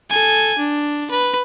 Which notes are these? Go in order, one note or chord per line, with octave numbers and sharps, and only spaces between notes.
A4 G#5
D4
B4